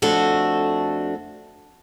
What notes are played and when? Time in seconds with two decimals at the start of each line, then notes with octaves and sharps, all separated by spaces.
0.02 F2 A3 D4 F#4 A4